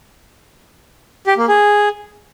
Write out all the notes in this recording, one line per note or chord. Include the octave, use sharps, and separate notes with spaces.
G4
A#3
G#4